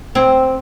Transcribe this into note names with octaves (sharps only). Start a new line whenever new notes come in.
C4